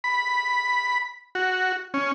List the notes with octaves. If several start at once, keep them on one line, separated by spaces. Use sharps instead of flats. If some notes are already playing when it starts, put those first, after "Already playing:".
B5
F#4
C#4